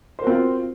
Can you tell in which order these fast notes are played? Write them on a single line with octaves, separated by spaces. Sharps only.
C5 A#4 F#4 C4 F4